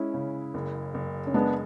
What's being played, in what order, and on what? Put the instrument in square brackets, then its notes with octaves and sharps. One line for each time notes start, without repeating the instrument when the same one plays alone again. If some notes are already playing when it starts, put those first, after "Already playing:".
Already playing: [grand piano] G#3 [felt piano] C#4 E4
[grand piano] C#3
F#1
F#1
[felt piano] C#4
[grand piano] G#3 [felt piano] B3 D4